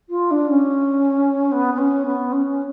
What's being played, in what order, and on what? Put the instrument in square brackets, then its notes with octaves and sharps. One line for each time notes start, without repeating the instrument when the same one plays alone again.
[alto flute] F4
D4
C#4
B3
B3
C#4
B3
C#4